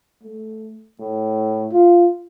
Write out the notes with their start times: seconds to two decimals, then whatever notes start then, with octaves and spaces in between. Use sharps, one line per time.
0.23 A3
1.00 A2
1.72 F4